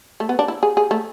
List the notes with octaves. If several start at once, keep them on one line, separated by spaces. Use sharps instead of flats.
A3
B3
D4
E4
G#4
G#4
A3